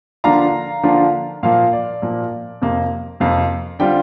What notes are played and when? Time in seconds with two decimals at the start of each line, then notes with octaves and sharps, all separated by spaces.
0.24 D3 F3 A#3 D4 F4 F5 A#5
0.83 D3 F3 A#3 D4 F4
1.43 A#2 F3 A#3 F5
1.73 D5
2.02 A#2 F3 A#3
2.62 F2 C3 A#3
3.20 F2 C3 A#3 F5
3.79 D3 G3 C4 F4 D5 G5